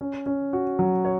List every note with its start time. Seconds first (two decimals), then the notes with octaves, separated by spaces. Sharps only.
0.01 C#4
0.26 C#4
0.53 F#4
0.79 F#3
1.05 C#5